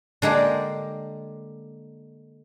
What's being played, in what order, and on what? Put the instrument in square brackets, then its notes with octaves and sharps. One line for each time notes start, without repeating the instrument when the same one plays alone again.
[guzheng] D3 G#3 A#3 G4